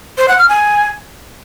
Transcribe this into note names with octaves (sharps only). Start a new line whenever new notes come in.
C5
F#5
F6
G#5